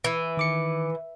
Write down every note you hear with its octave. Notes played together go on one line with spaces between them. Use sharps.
E3
D#3 D6 C#7